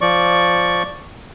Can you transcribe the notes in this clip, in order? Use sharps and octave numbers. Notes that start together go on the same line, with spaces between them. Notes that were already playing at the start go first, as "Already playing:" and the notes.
F3 D5 C#6